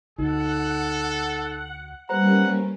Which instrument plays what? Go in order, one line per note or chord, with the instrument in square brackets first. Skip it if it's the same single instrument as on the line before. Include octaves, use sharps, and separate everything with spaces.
[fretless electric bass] D2 [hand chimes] D#4 [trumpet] A4 [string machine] F#5
[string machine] G3 A#3 C#4 [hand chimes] B4 C5 A#5 [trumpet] F#5